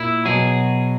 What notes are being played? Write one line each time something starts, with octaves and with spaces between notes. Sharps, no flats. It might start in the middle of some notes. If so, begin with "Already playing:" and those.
Already playing: A#2 E4
B2 F#3 G#4